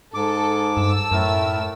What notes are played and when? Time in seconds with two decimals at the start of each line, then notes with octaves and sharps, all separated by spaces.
0.14 G#2 A4 D6
0.77 G2 A5 E6
1.12 F#2 A2 A3 A#4